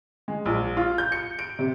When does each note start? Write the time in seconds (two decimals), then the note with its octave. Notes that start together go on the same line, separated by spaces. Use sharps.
0.28 G#3
0.46 A#1
0.77 F4
0.98 G6
1.12 C#7
1.39 D7
1.59 C3